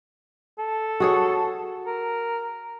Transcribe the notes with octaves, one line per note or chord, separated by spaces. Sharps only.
A4
F#4 G#4 C#5
A#4